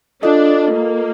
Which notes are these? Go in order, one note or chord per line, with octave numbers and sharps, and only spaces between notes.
D4 F4 A4 D#5
A#3